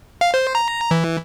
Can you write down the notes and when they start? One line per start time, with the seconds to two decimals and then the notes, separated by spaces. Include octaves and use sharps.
0.21 F5
0.34 C5
0.55 A#5
0.91 E3